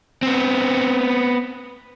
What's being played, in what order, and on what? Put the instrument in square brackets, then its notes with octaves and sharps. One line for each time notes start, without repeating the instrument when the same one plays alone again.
[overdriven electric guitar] B3 C4